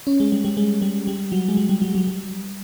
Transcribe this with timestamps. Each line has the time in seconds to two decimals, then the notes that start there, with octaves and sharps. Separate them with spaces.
0.07 C#4
0.20 G#3
0.32 G3
0.44 G3
0.57 G#3
0.82 G3
1.07 G3
1.32 F#3
1.49 G#3
1.57 G3
1.69 G3
1.82 F#3
1.95 F#3
2.07 G3